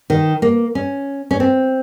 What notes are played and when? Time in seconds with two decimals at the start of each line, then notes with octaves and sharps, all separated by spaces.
0.10 D#3
0.42 A#3
0.75 C#4
1.31 C#4
1.40 C4